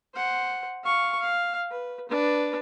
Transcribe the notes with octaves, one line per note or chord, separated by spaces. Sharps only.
C5 F#5
F5 C#6
F5
B4
D4 B4